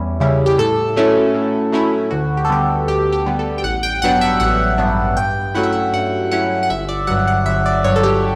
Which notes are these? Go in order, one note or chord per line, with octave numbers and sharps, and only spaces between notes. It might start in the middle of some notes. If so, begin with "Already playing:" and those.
Already playing: E2 G3 C#4 E4
C#3 G3 C#4 E4
G4
A2 A4
F#3 A3 C#4 E4
A2
F#3 A3 C#4 E4
D2 F#4
G4
A4
D3 G3 B3 G4
D2 G4
G4
D3 G3 B3
A4
G5
A1 F#5
G5
G2 F#3 B3 D4 F#5
E5
A1 F#5
G2 F#3 B3 D4
G2 G5
F#3 A3 C#4 E4 F#5
E5
F#5
G2 F#5
F#3 A3 C#4 E4 F#5
F#5
G1 E5
D5
G2 F#3 F#5
F#5
G1 E5
D5
G2 F#3 C#5
A4
G4